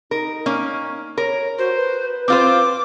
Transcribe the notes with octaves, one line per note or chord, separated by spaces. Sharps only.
D#4 A#4
A#3 C#4
A#4 C#5
F#4 C5
B4
C4 F4 C5 D6